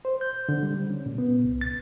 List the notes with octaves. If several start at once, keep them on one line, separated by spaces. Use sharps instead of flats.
C5
G6
D3
G3
C#4
A#2
B3
C2
A6